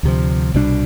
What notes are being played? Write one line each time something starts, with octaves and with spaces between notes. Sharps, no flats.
D2 C3 F3
C2 B2 G3 D4